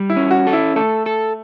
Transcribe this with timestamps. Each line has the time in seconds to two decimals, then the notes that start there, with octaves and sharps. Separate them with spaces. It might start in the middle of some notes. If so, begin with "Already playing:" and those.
Already playing: G3
0.10 E4
0.16 C#4
0.31 F#4
0.47 A4
0.53 E4
0.76 A3 A4
1.06 A4